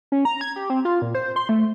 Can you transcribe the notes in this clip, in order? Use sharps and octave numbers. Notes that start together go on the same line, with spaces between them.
C#4
A#5
G#6
G4
C4
F4
A#2
C5
C6
A3